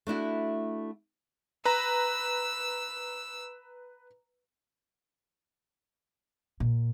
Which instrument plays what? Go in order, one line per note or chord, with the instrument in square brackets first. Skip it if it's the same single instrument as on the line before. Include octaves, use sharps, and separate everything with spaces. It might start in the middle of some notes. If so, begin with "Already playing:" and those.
[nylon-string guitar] A3 D4 E4 F#4
[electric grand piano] B4 A#5 [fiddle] E6
[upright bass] A#2